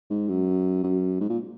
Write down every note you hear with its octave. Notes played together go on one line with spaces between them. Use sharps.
G#2
F#2
F#2
G#2
A#2